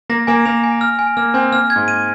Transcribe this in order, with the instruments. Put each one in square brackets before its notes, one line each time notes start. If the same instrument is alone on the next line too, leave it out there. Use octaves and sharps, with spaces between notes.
[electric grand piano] A#3 [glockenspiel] A#6
[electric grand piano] A#3 [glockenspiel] G#5
[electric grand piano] A#3 [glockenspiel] F7
[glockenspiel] G#5
F6
G#5
[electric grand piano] A#3 [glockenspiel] F6
[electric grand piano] C4 [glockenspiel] G#5
[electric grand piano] A#3 [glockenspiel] F6
[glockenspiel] G#6
[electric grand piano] G#2
[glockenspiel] D#7